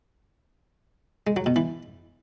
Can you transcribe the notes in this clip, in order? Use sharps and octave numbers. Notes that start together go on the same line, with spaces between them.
G#3
F#3
B2
E3